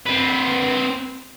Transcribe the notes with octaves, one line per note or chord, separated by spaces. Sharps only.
C4 B4